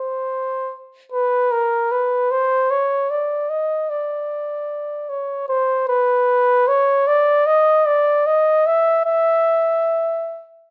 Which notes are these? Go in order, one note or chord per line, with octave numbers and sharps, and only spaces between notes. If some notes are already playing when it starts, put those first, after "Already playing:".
Already playing: C5
B4
A#4
B4
C5
C#5
D5
D#5
D5
C#5
C5
B4
C#5
D5
D#5
D5
D#5
E5
E5